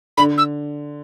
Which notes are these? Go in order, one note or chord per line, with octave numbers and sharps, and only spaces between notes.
D3 B5
E6